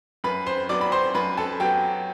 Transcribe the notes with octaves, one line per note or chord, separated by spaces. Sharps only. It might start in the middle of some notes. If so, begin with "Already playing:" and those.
F#2 B4 B5
C5 C6
F#3 B3 D5 D6
B5
C5 C6
F#2 B4 B5
A4 A5
F#3 B3 G4 G5